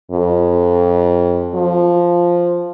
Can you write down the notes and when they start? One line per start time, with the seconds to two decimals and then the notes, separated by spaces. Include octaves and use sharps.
0.11 F2
1.55 F3